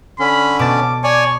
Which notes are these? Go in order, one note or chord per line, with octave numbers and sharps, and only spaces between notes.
D3 C#4 B5
B2 A5 D6
C#5 D5 G#5 C#6